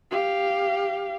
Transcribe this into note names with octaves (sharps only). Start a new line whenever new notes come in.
G4 F5